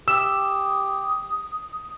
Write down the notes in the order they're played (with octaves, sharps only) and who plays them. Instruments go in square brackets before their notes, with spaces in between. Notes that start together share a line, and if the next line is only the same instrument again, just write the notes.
[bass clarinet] G4 [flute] D#6 [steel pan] E6